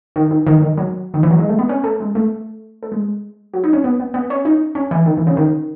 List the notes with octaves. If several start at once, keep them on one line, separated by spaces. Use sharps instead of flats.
D#3
D#3
D#3
D#3
F#3
D#3
E3
F#3
G#3
A3
B3
C#4
A3
G#3
A3
A3
G#3
F#3
D#4
C#4
B3
B3
B3
C#4
D#4
C#4
E3
D#3
E3
C#3
D#3